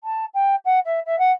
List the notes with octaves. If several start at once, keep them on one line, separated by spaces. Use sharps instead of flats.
A5
G5
F#5
E5
E5
F#5